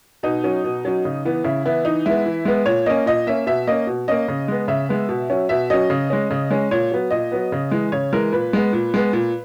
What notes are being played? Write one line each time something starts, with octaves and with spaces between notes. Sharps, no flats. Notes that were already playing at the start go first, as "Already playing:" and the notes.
B2 D#4
F#3 C#4
B2
F#3 C#4
C#3
E3 B3
C#3 E4
E3 B3 E4
E3 D#4
G#3 B3 E4
E3
G#3 B3
A#2 C#5
A#3 C#4 D#5
A#2 D#5
A#3 C#4 E5
B2 E5
A#3 C#4 D#5
B2
A#3 C#4 D#5
C#3
G#3 B3
C#3 E5
G#3 B3
B2
F#3 C#4
B2 E5
F#3 C#4 D#5
C#3
G#3 C#4
C#3
G#3 C#4
A#2 C#5
F#3 B3
A#2 D#5
F#3 B3
C#3
E3 G#3
C#3 C#5
E3 G#3 A#4
A#2 B4
G#3 B3
A#2
G#3 B3
A#2